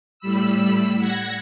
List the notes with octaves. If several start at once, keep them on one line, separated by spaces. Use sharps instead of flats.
A2 G3 B5 E6
F#5 G#6 A#6